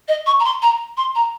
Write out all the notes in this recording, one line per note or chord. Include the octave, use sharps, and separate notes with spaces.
D#5
C#6
A#5
C6
A#5
C6
A#5